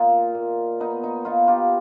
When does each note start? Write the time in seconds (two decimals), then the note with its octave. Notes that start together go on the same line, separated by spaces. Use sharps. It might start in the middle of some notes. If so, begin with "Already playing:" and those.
Already playing: A#2 D#4 F4
0.35 A#2
0.80 B3 D#4
1.03 D#4
1.25 B3 D#4 F4
1.48 F4 G4